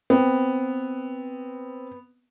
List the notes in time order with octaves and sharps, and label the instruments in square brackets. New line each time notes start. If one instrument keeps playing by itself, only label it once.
[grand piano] B3 [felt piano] C4